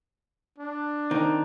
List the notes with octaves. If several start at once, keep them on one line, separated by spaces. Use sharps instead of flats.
D4
D#3 C4